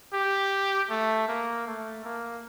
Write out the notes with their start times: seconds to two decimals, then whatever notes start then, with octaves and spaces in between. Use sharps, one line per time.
0.13 G4
0.90 A3
1.28 A#3
1.67 A3
2.04 A#3